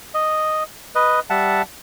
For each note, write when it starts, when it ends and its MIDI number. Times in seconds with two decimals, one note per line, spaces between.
0.14 0.63 75
0.95 1.20 71
0.95 1.20 75
1.30 1.62 55
1.30 1.62 76
1.30 1.62 78
1.30 1.62 81